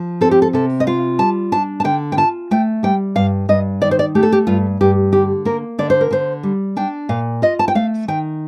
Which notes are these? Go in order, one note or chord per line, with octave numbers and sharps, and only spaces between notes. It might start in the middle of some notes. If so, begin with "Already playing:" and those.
Already playing: F3
C4 A4
G4
A4
C3 A4
D#5
F4 F5
G3 A5
D4 A5
A5
D3 G5
G5
F4 A5
A3 G5
G3 G5
G2 F5
G2 D#5
D#3 D5
C5
D5
A3 G4
A4
G4
G2 F4
G2 G4
D3 G4
A#3 A#4
D3 D5
C5
A#4
D3 C5
G3
D4 G5
A#2 F5
F4 D#5
A5
G5
A3 F5
D#3 G5